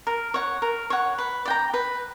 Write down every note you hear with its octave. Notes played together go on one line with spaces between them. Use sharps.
A#4
C#5 F#5
A#4
C#5 F#5
B4
D5 G5 A#5
B4